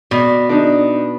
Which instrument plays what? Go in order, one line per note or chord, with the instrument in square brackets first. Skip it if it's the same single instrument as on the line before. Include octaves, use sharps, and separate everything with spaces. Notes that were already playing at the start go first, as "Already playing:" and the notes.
[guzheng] B2 [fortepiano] D5
[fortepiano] D4 D#4